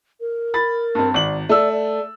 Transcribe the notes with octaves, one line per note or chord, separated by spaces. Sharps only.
A#4
B5 A6
G2 C4
G#1 D5 F#7
A3 D5 E6
D5